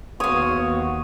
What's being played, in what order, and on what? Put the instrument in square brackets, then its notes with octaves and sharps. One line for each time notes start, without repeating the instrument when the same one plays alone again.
[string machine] D#2 [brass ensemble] B3 F#4 [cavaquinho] C#5 F5 [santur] D#6